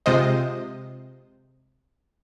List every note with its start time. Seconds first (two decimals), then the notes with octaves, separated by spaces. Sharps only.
0.06 C3 G#3 F4 C5 D#5